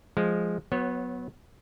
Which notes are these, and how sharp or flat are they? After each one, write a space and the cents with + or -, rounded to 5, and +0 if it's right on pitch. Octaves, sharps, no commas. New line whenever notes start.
F3 +0 G#3 +0
F#3 -15 B3 +0 C#5 -35